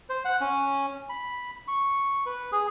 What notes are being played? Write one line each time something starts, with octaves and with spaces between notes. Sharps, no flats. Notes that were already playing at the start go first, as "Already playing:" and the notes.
C5
F#5
C#4
B5
C#6
B4
G#4